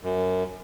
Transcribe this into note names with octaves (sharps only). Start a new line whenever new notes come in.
F#2